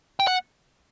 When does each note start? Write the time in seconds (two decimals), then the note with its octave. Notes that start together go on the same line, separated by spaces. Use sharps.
0.20 G5
0.27 F#5